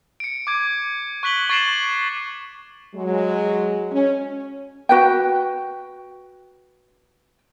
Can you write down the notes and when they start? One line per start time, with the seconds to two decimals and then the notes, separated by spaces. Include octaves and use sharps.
0.20 C#7 D7
0.47 D6 G#6 D7
1.23 C#6 F#6 B6 F#7 G7
1.49 C#6 A6 C7 D7 E7 F#7
2.94 F#3 G#3
3.92 C#4
4.89 F#4 B4 G5